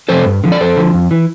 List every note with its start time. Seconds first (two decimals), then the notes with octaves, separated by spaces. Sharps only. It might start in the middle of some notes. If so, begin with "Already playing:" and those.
0.09 C3 F3 A4 C5
0.26 G2
0.44 D3 F3
0.52 D5
0.60 F2 A4 C5
0.77 D3 F3
0.94 F2
1.11 E3